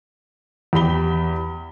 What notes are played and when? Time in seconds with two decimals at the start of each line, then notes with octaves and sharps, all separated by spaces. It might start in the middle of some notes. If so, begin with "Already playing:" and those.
0.73 E2 G4 B5 G7